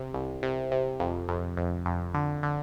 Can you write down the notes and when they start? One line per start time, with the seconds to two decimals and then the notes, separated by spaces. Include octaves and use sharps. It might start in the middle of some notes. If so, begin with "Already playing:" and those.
Already playing: C3
0.14 C2
0.43 C3
0.71 C3
1.00 F2
1.28 F2
1.57 F2
1.86 F2
2.14 D3
2.43 D3